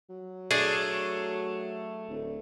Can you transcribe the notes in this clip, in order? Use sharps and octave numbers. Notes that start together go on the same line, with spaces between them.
F#3
A3 D4 G#4
D1